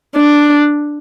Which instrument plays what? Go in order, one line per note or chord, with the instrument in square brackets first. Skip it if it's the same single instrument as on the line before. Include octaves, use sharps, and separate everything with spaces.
[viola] D4